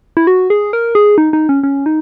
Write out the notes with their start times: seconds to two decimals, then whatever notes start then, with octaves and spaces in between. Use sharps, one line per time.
0.17 E4
0.27 F#4
0.50 G#4
0.73 A#4
0.95 G#4
1.18 D#4
1.33 D#4
1.49 C#4
1.63 C#4
1.86 D#4